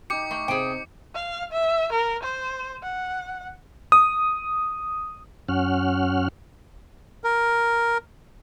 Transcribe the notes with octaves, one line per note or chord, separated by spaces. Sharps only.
D#4 G4 D6 C#7
A3
C3 G#4 G5
F5
E5
A#4
C5
F#5
D#6
F#2 C#4 F#5 F6
A#4